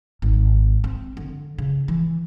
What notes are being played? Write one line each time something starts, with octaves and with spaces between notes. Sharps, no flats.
G#1
C4
D3
C#3
E3